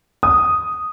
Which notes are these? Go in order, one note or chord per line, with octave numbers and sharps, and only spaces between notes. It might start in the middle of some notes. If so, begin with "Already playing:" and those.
D#6